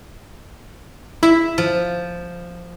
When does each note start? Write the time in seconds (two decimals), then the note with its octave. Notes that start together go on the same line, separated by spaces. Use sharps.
1.23 E4 E5
1.58 F3